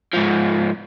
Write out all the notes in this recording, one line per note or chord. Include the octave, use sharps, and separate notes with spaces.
G#2 F3